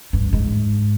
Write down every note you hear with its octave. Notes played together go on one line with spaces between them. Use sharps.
G2
G#2